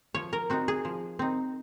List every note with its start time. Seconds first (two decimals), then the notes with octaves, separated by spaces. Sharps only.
0.14 F3 C#5
0.33 A#4
0.50 C4 D#4 F#4
0.68 G#4
0.85 F3
1.19 C4 D#4